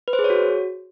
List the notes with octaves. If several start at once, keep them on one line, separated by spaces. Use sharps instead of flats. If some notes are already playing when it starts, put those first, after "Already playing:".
B4
C5
G#4
C#5
F#4